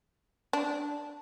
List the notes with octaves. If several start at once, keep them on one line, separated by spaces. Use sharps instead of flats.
D4